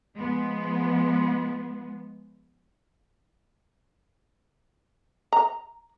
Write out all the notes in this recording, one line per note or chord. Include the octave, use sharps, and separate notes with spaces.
F3 G#3 B3
A#5